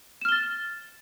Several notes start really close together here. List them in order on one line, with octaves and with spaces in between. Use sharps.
E7 F6 G7 A6